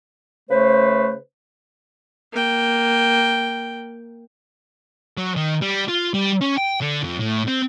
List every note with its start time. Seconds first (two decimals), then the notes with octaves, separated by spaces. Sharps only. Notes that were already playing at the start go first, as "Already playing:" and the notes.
0.49 C#3 A3 B4 C5
2.33 A#3 G5
5.18 F#3
5.36 D#3
5.61 G3
5.88 F4
6.14 G3
6.41 C#4
6.57 G5
6.81 D3
7.03 F2
7.19 A2
7.47 C4